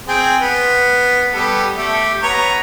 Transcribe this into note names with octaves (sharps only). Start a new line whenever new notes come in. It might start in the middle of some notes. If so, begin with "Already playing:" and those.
C4 G#4 G5
B3
G3 B3 A4
A3 G4
B3 C#5 A#5